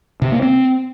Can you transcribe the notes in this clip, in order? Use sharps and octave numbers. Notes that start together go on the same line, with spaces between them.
C3
A#3
C4